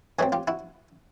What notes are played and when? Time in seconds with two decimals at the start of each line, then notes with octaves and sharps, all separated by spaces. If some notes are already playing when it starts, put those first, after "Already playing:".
0.19 B2 F#3 A3 C4 F#4 G#4
0.32 F4 G4
0.48 E4 F#4